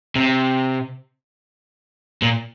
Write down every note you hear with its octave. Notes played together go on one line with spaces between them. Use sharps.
C3
A#2